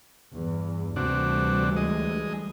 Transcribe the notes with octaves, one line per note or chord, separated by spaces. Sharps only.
E2 G2
D2 C3 E3 G3 D4 F#4
G#3 D#5